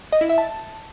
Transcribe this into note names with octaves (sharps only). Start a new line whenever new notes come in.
D#5
E4
E5
A5